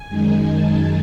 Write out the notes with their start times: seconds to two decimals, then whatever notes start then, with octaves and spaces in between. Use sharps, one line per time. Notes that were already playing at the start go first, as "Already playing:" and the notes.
Already playing: G#5
0.08 F#2 D#3 G#3 D#4
0.51 A5